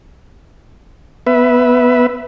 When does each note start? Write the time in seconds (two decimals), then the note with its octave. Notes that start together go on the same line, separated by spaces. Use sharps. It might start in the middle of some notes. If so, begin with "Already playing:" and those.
1.27 B3 B4 E5